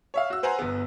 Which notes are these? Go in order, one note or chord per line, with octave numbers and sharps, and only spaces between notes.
C#5 E5 F5
F#4 E6
B4 C5 F#5 G#5 A#5 C6
G1 B3